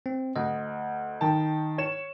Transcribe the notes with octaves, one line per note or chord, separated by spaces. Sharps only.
C4
D2 D#5
D#3 G5 A5
C#5 E7